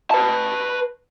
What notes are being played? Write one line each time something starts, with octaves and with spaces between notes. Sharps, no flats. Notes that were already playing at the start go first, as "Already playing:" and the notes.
B4 A5